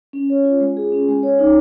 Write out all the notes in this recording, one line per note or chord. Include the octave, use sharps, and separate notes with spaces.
C#4
C#5
F4
G#3
G#4
C#4
G#3
C#5
D#4